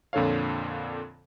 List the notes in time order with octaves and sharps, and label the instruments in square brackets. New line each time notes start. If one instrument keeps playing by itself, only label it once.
[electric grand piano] F2 A#2 D3 A4 C#5 F5